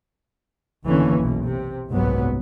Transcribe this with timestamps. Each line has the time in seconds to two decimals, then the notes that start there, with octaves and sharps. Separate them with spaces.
0.85 F#1 E2 D3 E3 A#3 C#4
1.17 B1 B2
1.45 C3
1.91 F#1 C2 G#2 F#3 B3